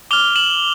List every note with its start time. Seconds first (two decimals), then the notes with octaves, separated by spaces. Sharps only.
0.11 D6 F6 F7 G7
0.36 E7 F#7